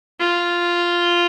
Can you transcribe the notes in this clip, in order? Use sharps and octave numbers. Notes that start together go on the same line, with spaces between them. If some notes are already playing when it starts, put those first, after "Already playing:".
F4